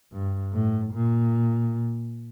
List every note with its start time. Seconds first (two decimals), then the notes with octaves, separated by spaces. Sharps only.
0.13 G2
0.53 A2
0.94 A#2